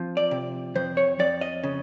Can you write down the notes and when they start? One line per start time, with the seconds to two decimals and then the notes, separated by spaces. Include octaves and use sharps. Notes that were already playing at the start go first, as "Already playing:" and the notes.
Already playing: F3 C4
0.17 D5
0.31 C3
0.75 F2 C5
0.97 C#5
1.19 F2 D5
1.41 D#5
1.63 C#3